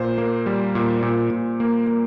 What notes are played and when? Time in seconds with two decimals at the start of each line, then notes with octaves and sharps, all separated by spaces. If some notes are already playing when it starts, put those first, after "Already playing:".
Already playing: A#2 C5
0.18 A#3
0.46 G3
0.75 A#2
1.03 A#2
1.30 A#2
1.60 A#3
1.87 A#3